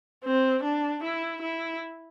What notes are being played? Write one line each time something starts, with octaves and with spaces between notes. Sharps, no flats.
C4
D4
E4
E4